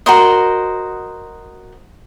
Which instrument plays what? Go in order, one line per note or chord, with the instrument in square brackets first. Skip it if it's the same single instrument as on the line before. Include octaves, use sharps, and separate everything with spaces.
[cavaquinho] F#4 A#4 C5 D#5